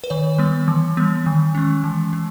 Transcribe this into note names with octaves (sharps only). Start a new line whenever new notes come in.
B4
D#3 C#5
G3 B3
E3
G3 B3
D#3
G#3 C#4
E3
G#3